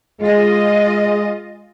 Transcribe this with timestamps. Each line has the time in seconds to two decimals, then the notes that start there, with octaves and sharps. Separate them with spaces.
0.21 G#3 F4 D#5